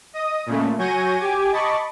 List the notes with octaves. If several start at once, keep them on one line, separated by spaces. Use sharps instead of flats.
D#5 D#6
A#2 C#3 A3
F#3 G#5 C#6 G6 A#6 D#7
G4 G#5 D6 G#6
D#5 A5 B5 C#6 D6